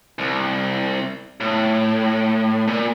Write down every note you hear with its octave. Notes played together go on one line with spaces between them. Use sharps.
C2
A2
A#2